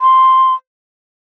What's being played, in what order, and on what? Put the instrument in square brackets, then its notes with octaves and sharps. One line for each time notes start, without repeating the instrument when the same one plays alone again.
[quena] C6